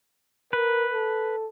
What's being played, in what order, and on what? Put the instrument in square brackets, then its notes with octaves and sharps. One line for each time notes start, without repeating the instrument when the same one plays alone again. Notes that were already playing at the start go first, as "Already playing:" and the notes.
[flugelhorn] A#4 [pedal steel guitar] B4
[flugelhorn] A4